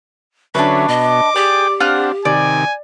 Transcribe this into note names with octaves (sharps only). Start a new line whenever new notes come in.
D3 F#3 C#4 D4 B4 E5
B2 D#5 D6
G4 G#4 D5 G5
C4 D4 F4 F#5 F6
C3 D#3 D5 G#5